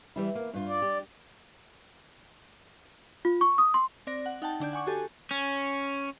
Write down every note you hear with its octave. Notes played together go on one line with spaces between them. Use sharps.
E3 G3 E4
A#3
G2 F4
D5
G4
F4
C#6
D#6
C6
C4 D5 A#6
F#5
D#4 F#5 G5 A5
D3 D4 D5 G6
F#5 G#5 C#6 D6
F#4 G4 A4 G#5
C#4